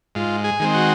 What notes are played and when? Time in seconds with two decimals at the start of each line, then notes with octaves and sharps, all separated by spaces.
0.15 G#2 F4
0.44 G#4
0.59 D#3 G#3 C4
0.74 F#4